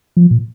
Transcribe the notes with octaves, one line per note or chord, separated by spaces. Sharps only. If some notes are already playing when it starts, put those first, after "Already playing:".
F3
A#2